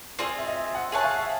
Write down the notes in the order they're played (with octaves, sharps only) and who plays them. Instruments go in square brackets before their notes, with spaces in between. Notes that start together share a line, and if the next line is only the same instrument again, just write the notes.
[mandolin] C4 F4 G#4 [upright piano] D5
[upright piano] E5
D#5
E5
F#5
[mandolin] G#4 C#5 F#5 A5 [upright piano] E5
[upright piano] F5
E5